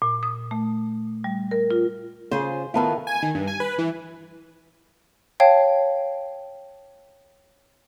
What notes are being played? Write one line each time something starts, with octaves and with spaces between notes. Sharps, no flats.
A#2
D#6
A3
G3
A#4
F4
C#3 F4 G#4 C5
D#3 B3 E4 F4 A4 F5
G#5
D#3
G2
G#5
B4
E3
C#5 F5 G5 A5